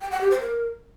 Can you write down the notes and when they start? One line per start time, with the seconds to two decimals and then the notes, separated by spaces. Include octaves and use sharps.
0.01 G5
0.11 F#5
0.21 G4
0.31 C5
0.40 A#4